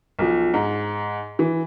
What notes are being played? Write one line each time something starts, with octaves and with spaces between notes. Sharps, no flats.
B1 F3
G#2
E3